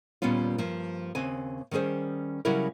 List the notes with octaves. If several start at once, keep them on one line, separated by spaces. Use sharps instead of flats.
D#2 A#2 G3 B3 C#4 F4
G2 F3 A#3
D#2 C#3 C4 G#5
D#3 G3 C#4 G#4 C5
C#3 F#3 G3 C#4 E4 A#4